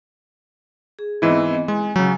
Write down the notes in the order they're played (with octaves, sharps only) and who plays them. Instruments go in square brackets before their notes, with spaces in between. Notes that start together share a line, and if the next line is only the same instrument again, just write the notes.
[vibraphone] G#4
[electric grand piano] G#2 E3 E4 [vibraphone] B3 C4 D#5
[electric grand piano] G#3 [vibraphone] G#5
[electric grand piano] C#3 F#3